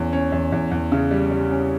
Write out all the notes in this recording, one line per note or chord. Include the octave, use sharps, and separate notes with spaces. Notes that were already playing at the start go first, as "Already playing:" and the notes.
Already playing: E2 C#4
C#4
E2
E2
E2
C#3
G3
G3
C#4